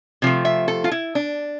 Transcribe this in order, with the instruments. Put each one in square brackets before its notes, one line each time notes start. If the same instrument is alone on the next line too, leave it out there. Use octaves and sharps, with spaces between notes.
[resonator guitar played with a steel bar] C3 F3 A3
E5
A4
F4
E4
D4